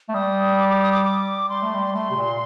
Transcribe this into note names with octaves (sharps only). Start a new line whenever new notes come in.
A3
G3 D#6
D6
D6
D#6
D6
D6
G3 C6
A3
G3
A3 C6
C3
A#2